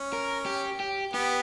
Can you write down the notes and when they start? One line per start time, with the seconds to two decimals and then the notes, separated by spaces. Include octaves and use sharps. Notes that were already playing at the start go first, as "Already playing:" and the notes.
Already playing: C#4
0.13 A#4
0.46 G4
0.80 G4
1.14 B3 G4